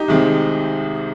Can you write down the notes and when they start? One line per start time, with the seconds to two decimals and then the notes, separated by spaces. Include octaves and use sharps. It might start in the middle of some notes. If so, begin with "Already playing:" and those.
Already playing: D#4 G4
0.08 C2 C3 D#3 G#3 C4